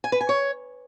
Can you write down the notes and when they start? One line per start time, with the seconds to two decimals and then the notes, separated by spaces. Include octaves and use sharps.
0.04 G#5
0.12 B4
0.21 G#5
0.29 C#5